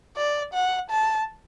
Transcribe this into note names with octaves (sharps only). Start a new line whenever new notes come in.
D5
F#5
A5